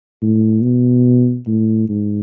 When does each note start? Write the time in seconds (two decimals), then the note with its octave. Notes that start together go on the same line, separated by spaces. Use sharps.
0.22 A2
0.63 B2
1.47 A2
1.89 G#2